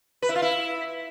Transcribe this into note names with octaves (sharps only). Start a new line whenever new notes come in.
B4
E4
F4
E4